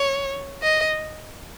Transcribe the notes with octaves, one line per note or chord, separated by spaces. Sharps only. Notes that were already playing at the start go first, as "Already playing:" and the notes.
Already playing: C#5
D#5